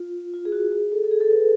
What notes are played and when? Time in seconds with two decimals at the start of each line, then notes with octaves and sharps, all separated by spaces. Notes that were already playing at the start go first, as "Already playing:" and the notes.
Already playing: F4
0.34 F4
0.45 G#4
0.52 F#4
0.72 G#4
0.92 A4
1.04 A4
1.11 G#4
1.21 A4
1.31 B4